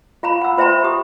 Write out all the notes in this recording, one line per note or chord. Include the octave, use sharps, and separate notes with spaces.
F4 F5 A#5 B5
F#5 E6
F4 C5 E5 G5 A#5 C6
G4 D#6